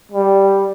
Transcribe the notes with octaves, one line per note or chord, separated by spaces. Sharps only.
G3